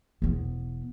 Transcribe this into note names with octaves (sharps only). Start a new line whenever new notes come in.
E1 B3